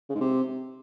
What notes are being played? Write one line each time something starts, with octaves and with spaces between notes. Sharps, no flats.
C#3
G#2
C3